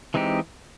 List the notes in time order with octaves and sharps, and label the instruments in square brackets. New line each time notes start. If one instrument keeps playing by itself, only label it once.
[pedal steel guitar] E3 G#3 C4 D#4 G4